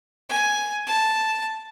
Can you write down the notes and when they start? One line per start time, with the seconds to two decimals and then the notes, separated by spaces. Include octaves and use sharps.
0.29 G#5
0.87 A5